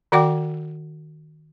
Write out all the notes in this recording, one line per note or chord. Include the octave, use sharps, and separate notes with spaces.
D#3 F#4 D5 F#5 G5 D6